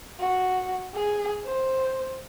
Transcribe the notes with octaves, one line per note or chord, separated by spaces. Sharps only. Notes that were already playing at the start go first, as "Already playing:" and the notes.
F#4
G#4
C5